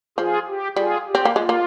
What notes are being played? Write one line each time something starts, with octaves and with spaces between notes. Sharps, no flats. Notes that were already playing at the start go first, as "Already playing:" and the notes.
F3 F4 G#4
G4
G3 F4 G#4
G4
C4
A#3
G#3 F4
A#3